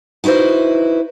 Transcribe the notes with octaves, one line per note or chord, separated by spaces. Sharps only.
D#4 E4 F#4 B4 C5